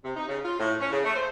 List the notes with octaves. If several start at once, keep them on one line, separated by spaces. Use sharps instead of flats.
C3
D#4
C#3
F4
A2
C#4
C#3
A3
C5